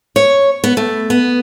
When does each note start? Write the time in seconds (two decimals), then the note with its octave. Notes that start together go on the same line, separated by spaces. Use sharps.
0.16 C#5
0.64 B3
0.77 A3
1.10 B3